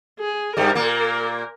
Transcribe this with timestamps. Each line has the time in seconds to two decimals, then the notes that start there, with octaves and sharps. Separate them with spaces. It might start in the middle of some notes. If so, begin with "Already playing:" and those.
0.20 G#4
0.57 G2 G3 A#4
0.75 A#2 A#3